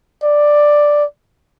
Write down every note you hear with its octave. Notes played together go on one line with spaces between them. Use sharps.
D5